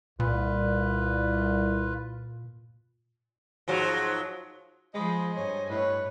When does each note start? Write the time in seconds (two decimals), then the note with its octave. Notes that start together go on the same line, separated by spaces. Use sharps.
0.20 C2 A#2 F4 B4
3.68 G#2 F3 F#3
4.95 F3 G#3 C5 D#5 B5
5.35 G2 C#5 G#5
5.70 A2 B4 C#5